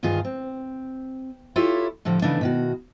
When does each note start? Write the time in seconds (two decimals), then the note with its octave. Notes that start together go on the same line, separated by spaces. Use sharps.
0.03 D2 G2 D#3 F4 G#4
0.25 C4
1.56 E4 F4 G4 A4 C#5
2.05 A2 D3 F3 G3
2.22 C#3 E3 A3 B3 D4 D#4
2.41 B2 D#3 F#4